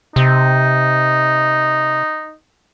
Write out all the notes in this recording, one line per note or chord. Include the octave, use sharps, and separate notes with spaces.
C3 D#4